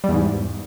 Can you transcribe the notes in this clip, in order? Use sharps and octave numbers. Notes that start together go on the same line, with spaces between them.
G3
E2
G#2